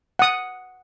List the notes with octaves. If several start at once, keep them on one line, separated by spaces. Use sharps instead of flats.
F#5 D#6